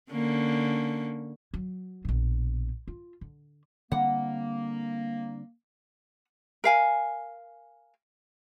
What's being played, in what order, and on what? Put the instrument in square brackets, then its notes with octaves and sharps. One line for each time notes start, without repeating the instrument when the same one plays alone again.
[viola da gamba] D3 A#3 C#4
[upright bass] F#3
A#1 B2
F4
D3
[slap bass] D3 G3 C4 [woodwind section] A#3 [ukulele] F#5
[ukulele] A#4 F5 G#5